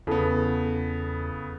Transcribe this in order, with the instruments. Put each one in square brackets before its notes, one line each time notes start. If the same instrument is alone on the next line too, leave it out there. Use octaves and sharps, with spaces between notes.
[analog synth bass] E2 [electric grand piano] C#3 B3 [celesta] E4 A4 A5